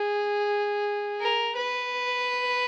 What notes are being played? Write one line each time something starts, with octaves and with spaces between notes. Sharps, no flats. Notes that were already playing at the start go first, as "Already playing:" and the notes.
Already playing: G#4
A#4
B4